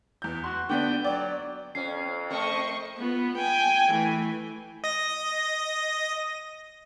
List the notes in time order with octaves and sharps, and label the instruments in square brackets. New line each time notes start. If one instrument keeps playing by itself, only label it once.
[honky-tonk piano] E2 G6
[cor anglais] F#4 [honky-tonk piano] C6
[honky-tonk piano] D3 B3 D4 [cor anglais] G5
[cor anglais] F#3 [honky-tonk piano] D5
[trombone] F2 [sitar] C#4 [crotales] C7
[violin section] A3 D#5 C#6 [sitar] C4 A#4
[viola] B3 F4
G5 G#5
E3 A3
[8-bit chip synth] D#5 A#6